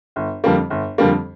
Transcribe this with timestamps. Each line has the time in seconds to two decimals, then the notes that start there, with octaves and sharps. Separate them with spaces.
0.16 G1
0.44 F2 D3 G3 A#3
0.70 G1
0.98 F2 D3 G3 A#3